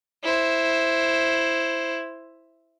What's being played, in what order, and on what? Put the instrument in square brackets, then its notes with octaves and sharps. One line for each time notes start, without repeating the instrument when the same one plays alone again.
[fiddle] E4 C5